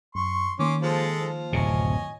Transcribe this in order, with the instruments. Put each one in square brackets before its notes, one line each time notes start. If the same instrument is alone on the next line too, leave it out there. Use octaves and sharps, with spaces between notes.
[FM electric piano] F#2 [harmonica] C6 C#6
[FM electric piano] D#3 A#3 [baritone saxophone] C#4 [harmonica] C6 D6
[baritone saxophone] F3 [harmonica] G#3 A4
[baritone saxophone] F3
[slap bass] D1 F#2 C3 [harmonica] C#5 D#5 G#5